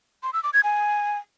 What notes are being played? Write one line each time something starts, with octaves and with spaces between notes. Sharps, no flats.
C6
E6
D6
G#6
G#5